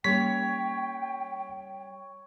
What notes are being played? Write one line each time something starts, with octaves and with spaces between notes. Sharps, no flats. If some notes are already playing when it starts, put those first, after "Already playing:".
G3 A#3 C#4 C#5 G5 B6